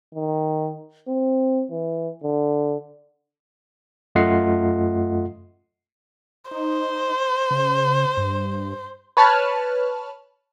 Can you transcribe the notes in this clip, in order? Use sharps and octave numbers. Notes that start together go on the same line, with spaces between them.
D#3
C4
E3
D3
F#2 A3 F4 D#5 F#5 C7
D#4 C5
C#3
G2
B4 C#5 A5 B5 F6 F#6